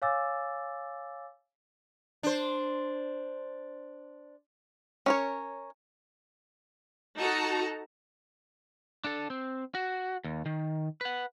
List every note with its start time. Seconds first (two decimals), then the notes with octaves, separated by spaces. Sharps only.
0.02 C#5 F5 G#5 D6 E6 A6
2.23 D4 C5
5.06 C#4 A#4 C#5
7.17 D#4 F#4 A4 A5 A#5
9.04 D4 A4
9.30 C4
9.75 F#4
10.24 D#2
10.46 D#3
11.01 B4 F#5